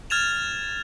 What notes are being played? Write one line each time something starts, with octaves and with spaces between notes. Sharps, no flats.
F6 G#6 A6 E7 F7